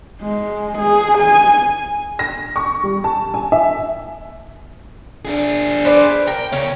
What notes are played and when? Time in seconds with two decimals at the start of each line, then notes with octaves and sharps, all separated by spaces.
0.22 G#3
0.78 G#4
1.18 G#5
2.19 A#6
2.56 C#6
2.83 G3
3.04 A5
3.34 G#5
3.52 E5
5.25 D4 G#4
5.85 B4 C5 D5
6.27 A#4 G5
6.52 C#3 C#4